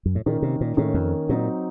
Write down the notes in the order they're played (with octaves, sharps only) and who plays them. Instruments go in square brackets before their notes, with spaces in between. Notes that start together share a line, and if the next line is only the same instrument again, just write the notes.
[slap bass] F#2
A2
[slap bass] A#2 [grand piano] D#3 A#3 C#4
[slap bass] C3
A#2
[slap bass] A2 [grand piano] D#3 A#3 C#4
[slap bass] F2
[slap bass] A#2 [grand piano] F#3 C4 D#4